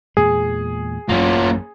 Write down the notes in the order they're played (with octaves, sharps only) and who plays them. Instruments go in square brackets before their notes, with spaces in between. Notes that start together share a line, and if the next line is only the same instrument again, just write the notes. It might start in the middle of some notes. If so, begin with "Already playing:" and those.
[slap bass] E2 A#2 G#3 [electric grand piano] G#4
[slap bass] A1 F#2 [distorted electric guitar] A#3 C#4 [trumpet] F4